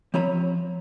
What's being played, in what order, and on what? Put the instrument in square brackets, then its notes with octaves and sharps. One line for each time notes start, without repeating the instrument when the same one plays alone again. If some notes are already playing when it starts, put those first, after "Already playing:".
[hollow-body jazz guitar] F3 C4 C#5 A#5 B5